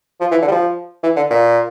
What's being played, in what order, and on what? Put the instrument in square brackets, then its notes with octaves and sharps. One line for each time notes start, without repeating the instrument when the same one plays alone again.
[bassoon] F3
E3
D3
G3
F3
E3
D3
A#2